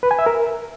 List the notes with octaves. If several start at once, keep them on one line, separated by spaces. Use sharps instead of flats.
B4
G#5
E5
A#4